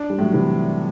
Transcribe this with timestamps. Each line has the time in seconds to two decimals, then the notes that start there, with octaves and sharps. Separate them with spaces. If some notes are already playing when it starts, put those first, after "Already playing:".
Already playing: D4
0.10 G3
0.19 A2 F#3
0.33 C3 E3